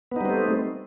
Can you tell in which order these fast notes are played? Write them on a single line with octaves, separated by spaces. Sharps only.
B3 D#4 G3 C4 A3